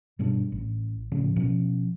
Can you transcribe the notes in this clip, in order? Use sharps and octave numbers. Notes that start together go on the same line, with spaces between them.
G2 B2 G3 D4
A1
A2 C#3 F3
B2 F3 C#4